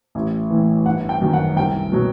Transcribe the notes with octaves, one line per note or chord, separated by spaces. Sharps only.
A1
A2 E3
G1 F#5
G5
F#2 D#3 F#3
F#5
C2 G5
B2 F#3